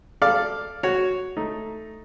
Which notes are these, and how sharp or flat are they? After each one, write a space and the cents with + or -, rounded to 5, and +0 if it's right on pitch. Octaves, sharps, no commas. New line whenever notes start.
A4 +0 D5 +0 F5 +0
F#4 +0 C#5 +0
A3 +0 D#4 +5